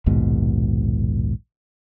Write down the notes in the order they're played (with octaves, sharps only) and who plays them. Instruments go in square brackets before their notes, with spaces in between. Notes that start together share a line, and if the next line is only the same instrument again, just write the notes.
[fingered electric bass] A#1 D#2 G#2 B2